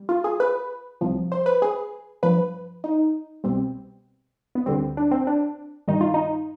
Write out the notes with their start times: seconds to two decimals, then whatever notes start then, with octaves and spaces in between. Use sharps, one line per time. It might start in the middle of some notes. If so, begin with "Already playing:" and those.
Already playing: G3
0.09 F4
0.24 G#4
0.40 B4
1.01 C2 C3 F3
1.32 C5
1.46 B4
1.62 G#4
2.23 G2 F3 B4
2.84 D#4
3.44 C2 B2 G3 C4
4.55 B3
4.66 D2 D3 G3 C4
4.97 D4
5.11 C4
5.27 D4
5.88 G2 D#3 G3 D#4
6.01 F4
6.14 D#4